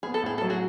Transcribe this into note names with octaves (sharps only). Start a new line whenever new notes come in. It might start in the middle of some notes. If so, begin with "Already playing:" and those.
B3 G#4
A4
A2 G#4
F#3 A4
F#4 G#4